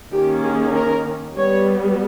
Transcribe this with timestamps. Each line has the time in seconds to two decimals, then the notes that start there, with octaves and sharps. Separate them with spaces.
0.12 D#3 A#3 C#4 G4
0.43 G#4
0.75 A#4
1.37 G3 B3 C#5